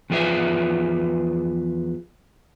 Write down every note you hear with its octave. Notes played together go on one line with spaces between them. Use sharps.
E2 F3 F4 G#4 B4 E5